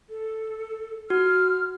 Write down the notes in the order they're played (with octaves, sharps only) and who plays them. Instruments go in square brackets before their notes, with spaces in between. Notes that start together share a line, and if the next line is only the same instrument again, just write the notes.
[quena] A4
[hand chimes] F#4 [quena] F6